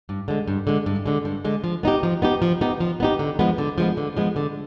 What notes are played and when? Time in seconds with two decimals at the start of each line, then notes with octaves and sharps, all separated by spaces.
0.09 G2
0.28 D3 G#3
0.48 G2
0.67 D3 G#3
0.86 G2
1.06 D3 G#3
1.25 G2
1.45 D3 G#3
1.64 F3
1.83 B3 D#4 G4
2.03 F3
2.22 B3 D#4 G4
2.42 F3
2.61 B3 D#4 G4
2.80 F3
3.00 B3 D#4 G4
3.19 D3
3.39 F3 G#3 B3
3.58 D3
3.78 F3 G#3 B3
3.97 D3
4.17 F3 G#3 B3
4.36 D3